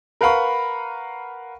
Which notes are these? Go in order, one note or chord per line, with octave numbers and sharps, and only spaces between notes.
A#4 B4 F5 F#5 B5 C#6